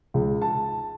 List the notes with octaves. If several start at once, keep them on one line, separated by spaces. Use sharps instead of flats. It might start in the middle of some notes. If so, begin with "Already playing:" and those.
C#2
A5